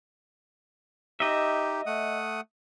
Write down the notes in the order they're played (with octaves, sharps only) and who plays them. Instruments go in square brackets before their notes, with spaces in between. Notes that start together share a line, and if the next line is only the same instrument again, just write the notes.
[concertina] D#4 G4 [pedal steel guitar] D#5 E5
[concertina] A3 F#5 D#6